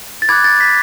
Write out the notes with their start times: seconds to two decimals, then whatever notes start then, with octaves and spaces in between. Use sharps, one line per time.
0.22 A6
0.29 B5 D6 F#6 G#6
0.44 A6
0.60 B6